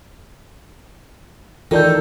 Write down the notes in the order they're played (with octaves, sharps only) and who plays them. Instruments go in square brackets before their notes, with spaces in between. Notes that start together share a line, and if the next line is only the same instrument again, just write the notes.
[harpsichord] D#3 [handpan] E3 A4 [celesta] F4 D5 G6